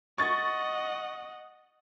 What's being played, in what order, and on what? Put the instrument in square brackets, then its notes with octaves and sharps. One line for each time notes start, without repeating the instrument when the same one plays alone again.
[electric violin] D#5 F#5 [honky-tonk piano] C#6 A6